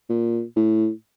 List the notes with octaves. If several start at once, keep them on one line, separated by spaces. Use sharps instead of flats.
A#2
A2